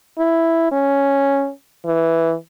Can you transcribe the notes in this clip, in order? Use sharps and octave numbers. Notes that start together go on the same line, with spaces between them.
E4
C#4
E3